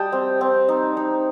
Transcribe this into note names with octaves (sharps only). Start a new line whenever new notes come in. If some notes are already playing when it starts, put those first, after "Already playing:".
Already playing: G3 D#5 G5 A5
C4
C4
D#4
D#4